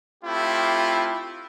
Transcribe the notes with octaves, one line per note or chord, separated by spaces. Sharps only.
A3 C4 E4 F4 G4